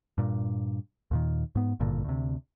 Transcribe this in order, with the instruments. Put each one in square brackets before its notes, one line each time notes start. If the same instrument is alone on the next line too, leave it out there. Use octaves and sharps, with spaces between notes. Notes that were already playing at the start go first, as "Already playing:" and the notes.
[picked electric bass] G2 A#2
D#2 A#2 D#3
G#2 B3
G#1 G2 A#2 D3
D2 C3